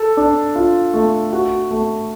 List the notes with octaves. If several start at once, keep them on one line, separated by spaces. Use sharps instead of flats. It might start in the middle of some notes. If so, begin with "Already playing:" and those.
Already playing: A4
D4
F4
A3
F#4
A3